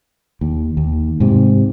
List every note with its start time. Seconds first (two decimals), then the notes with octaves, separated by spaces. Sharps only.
0.41 D#2
0.77 D#2
1.20 G#2 C3